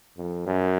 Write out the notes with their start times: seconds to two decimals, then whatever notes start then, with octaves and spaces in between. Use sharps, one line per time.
0.17 F2
0.46 F#2